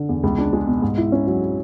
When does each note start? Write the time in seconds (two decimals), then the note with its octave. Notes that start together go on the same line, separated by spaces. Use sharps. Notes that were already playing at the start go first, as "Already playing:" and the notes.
Already playing: D3
0.09 E2
0.23 C#2
0.38 D4
0.53 G#3
0.67 B2
0.82 G#2
0.98 E4
1.12 C#4
1.27 F#3